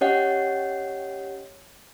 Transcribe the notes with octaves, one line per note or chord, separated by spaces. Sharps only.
C#4 G4 C#5 D#5 F#5